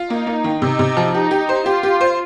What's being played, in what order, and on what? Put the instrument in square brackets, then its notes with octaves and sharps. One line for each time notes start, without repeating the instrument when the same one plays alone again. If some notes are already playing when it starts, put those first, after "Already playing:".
Already playing: [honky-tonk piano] F4
[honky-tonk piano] A#3 [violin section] D#4
[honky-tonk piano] A#3
D#3
[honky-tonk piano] C3 [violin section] D#4
[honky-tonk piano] C3
F3
[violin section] D#4 [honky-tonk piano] G4
[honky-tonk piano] G4
C5
[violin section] F4 [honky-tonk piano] G4
[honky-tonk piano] G4
C5